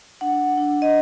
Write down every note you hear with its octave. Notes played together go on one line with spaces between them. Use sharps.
D4 F#5
D4
D#5